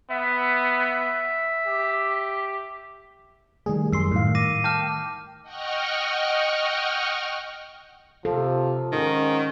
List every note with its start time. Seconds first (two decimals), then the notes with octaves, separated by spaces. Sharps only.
0.10 B3 E5
1.67 G4
3.66 D#3 G3 A3 G#4
3.93 F#2 C6 E6 C7
4.11 A2 D#3 F5
4.35 D6 A#6 D#7
4.64 G5 A5 D6 F6
5.43 D#5 F#5 G5 C#6 F6
8.25 C3 F3 A4
8.92 G#2 D#3 C#4